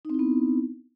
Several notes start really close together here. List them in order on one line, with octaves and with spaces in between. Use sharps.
D#4 C4 E4 B3